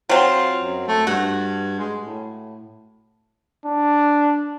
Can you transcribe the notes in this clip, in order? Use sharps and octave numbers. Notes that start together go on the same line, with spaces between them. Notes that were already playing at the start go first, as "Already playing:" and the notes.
F#3 C4 F4
F#2
A3
G2 F#4
G#3
A2
D4